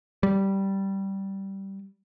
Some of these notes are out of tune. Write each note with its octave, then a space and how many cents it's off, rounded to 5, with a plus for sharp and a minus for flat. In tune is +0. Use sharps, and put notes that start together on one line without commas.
G3 -10